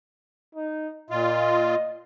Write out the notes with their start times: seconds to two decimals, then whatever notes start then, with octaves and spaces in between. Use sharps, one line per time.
0.55 D#4
1.10 A#2 F4 D#5